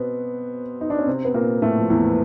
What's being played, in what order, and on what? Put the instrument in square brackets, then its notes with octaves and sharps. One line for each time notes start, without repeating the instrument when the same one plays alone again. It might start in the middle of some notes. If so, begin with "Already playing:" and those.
Already playing: [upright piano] B2 B3 C4
D#4
D4
C#4
C3 C4
B3
A#2 A#3
A2 A3
F3
E2 E3